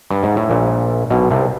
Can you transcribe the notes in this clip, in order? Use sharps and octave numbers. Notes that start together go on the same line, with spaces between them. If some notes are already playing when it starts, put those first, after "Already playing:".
G2
G#2
A2
A#1 A#2
B1 B2
C2 C3